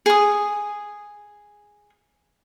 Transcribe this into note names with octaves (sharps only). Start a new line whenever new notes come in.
G#4 D#6